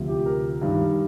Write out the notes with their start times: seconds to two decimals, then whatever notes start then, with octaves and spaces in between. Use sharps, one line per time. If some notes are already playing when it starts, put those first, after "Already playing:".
Already playing: D2 C3 F3
0.08 G4
0.26 A#4
0.62 G2 D#3